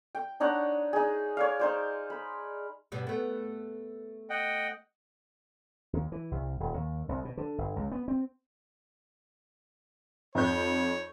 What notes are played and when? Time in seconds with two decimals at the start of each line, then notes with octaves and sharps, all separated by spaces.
0.15 G5
0.40 D4 D#4 C#5 F#5
0.93 D#4 G#4
1.37 C#5 D5 F5
1.59 D#4 C5 D5
2.10 B5
2.92 G2 B2 G3
3.07 A3 B3
4.30 D#5 F#5 G5
5.93 D#2
6.12 E3
6.31 C2
6.60 D#1
6.74 D#2
7.09 C2
7.25 B2
7.37 D3
7.58 G1
7.76 C#2
7.92 B3
8.08 C4
10.35 F2 D#4 C#5 G6